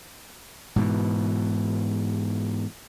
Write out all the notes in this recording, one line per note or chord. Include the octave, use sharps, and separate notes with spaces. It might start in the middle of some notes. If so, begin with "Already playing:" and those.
G#2 B2 E3